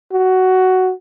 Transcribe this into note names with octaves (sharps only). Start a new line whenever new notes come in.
F#4